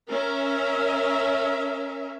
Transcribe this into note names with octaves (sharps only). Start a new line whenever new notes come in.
C#4 A#4 E5